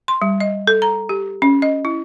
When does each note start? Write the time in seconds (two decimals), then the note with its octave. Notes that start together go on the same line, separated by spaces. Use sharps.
0.08 C6
0.22 G3
0.40 D#5
0.67 A4
0.82 A#5
1.09 G4
1.42 C#4
1.62 D#5
1.85 E4